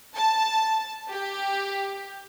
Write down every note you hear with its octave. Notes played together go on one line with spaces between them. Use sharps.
A5
G4